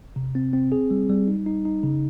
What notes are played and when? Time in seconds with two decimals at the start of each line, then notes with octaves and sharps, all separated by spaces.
0.16 C3
0.35 C4
0.53 C4
0.72 G#4
0.91 G3
1.09 G3
1.28 D#4
1.46 D#4
1.65 D#4
1.83 C#3